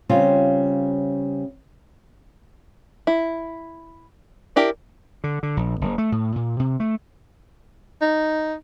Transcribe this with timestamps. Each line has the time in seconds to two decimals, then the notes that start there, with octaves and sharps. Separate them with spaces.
0.09 C#3 G3 C4 C#4 F4
3.07 E4
4.56 D4 E4 G4 A#4
5.24 D3
5.43 D3
5.57 A#1
5.81 F#1
5.98 A3
6.12 A2
6.36 A#2
6.60 C3
6.80 A3
8.02 D#4